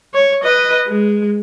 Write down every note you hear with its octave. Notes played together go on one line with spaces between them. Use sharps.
C#5
B4 D#5
G#3